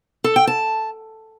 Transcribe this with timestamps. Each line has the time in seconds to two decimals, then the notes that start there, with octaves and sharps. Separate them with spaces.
0.24 A4
0.36 G5
0.47 A5